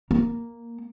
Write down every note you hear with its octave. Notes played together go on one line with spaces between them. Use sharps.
A#3